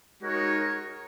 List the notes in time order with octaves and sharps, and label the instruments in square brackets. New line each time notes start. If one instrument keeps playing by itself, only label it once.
[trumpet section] G#3 D#4 F#4 A#4 C#5